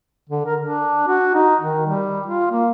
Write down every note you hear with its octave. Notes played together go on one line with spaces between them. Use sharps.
D3
A#4
D4
F#4
D#4
D#3
G3
F4
A#3